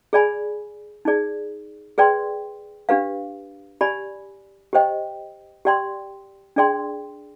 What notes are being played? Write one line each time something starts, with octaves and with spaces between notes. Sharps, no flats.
G#4 D5 G#5 B5
D#4 G#4 D5
G#4 B4 D5 G5 C6
D4 G4 B4 F5
G4 D5 G#5 B5
G4 C5 D#5 G5
G4 D5 G5 C6
D4 G#4 D5 G5 C6